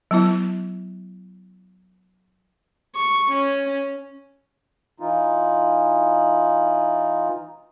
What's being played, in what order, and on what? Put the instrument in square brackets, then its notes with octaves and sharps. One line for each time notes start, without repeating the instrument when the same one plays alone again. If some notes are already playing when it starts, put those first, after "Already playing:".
[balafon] F#3 B3 E4
[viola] C#6
C#4
[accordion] E3 D#4 F4